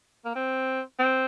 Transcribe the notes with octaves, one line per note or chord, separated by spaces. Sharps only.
A#3
C4
C4